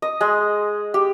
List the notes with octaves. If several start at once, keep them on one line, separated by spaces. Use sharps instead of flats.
D#5
G#3
G4